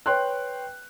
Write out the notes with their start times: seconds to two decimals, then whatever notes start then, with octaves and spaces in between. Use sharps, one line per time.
0.06 B4 C#5 G5 C6 F#6